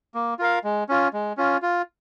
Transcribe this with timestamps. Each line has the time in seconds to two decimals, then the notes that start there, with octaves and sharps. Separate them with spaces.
0.15 A#3
0.39 F4 A#4 F5
0.64 G#3
0.89 C#4 F4
1.13 G#3
1.37 C#4 F4
1.62 F4